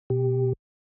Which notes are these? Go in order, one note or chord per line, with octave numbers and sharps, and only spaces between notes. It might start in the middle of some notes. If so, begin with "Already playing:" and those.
B2 G4